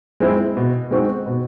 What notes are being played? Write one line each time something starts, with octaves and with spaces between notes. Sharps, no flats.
G#3 C4 E4
B2
G#3 C4 D#4 F#4
B2